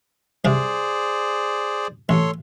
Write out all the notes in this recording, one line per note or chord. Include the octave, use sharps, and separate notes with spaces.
C2 C3 G#4 C5 D5
A1 A4 C#5 C6